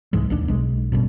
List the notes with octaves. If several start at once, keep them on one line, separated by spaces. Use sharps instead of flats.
C2 G#2 E3 G#3
A#1 D#2 D4
B1 G#3
A1 G2 B2